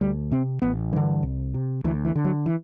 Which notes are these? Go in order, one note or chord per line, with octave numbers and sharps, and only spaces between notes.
D2 G3
C3 C4
A1 B3
G2 D3 E3
C2
C3
D2 E3
E3
D3
F#3
E3